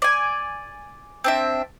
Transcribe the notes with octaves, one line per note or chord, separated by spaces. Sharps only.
D5 G#5
C4 D4 E5